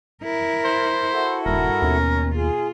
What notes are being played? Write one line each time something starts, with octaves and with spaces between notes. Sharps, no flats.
E4 A#4
C5
E4 F#4 A4
D#1 G2 A#4
D#2 B2 C#4
F4 G#4